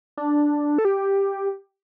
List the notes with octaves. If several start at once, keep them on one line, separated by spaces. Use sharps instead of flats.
D4
A4
G4